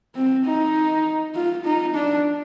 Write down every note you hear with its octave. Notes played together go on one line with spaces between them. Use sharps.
C4
D#4
F4
D#4
D4